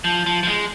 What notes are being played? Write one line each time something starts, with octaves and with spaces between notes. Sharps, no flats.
F3
F3
F3
G#3